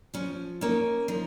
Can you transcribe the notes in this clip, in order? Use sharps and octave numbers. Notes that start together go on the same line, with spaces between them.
F3 C#4
A#3 C#4 D#4
F3 D#4